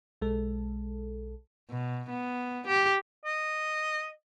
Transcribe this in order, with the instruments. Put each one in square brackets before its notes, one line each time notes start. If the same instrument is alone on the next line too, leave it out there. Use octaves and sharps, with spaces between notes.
[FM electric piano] B1 G#3 A4
[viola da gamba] B2
B3
G4
[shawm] D#5